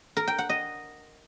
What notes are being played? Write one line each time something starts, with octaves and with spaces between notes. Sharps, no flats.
A#4
G5
F#5
D#5